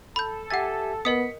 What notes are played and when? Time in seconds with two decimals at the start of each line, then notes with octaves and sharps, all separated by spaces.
0.16 A4 B5 G6
0.50 G4 E5 F#5 G#5 A6
1.05 B3 A#4 D#5 D#6 B6 C#7